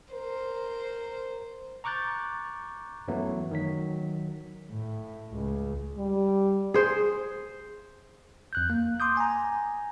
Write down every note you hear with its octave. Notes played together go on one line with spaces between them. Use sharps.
A#4 C5
A#5 C#6 D6 F#6 G6 A6
F#2 E3 F#3 A3 B3
D#3 F#3 B6
A2
C#2
G3
G#4 C5
F2 F#6 G6
A#3
C6 D6 D#6 G6
G#5 A#5